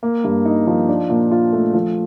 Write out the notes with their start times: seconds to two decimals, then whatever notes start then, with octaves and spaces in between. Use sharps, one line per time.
0.03 A#3
0.24 G2
0.45 D#4
0.67 F3
0.88 D4
1.10 A#2
1.31 F4
1.52 A3
1.74 F3